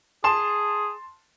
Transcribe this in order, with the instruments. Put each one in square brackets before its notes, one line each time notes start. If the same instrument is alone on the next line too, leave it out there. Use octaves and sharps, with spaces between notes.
[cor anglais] G#4 [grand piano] A5 C6 E7